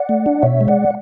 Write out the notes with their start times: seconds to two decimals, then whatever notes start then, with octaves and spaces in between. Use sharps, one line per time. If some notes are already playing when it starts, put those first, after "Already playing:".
Already playing: D5 F#5
0.09 A3
0.26 D4
0.43 B2 C#5 E5
0.61 G#3
0.68 D5 F#5